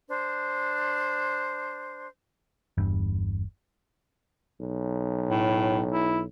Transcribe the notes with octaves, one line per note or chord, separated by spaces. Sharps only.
D4 C5
G1 E2 G2
B1
A2
E4